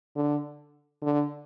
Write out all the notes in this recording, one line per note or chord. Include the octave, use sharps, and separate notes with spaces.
D3
D3